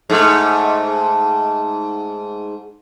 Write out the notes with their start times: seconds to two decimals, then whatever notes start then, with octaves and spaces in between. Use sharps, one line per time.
0.10 G#2 A3